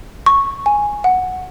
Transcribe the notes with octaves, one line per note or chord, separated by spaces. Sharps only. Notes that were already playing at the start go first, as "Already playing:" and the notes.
C#6
G#5
F#5